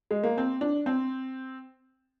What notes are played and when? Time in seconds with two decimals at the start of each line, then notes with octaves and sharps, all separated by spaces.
0.11 G#3
0.24 A#3
0.38 C4
0.61 D4
0.86 C4